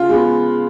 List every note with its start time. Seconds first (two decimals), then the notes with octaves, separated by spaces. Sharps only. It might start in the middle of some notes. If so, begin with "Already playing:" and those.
Already playing: C#3 F4
0.09 G#3 B3